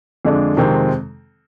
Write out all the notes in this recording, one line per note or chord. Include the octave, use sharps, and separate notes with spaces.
F2 D3 G#3 D4
F2 C3 D#3 G#3 C4